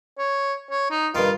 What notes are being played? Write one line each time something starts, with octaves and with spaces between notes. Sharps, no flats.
C#5
C#5
D#4
G2 D#3 F4